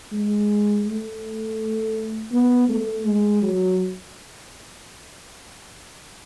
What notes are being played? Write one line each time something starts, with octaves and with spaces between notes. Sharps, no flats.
G#3
A3
B3
A3
G#3
F#3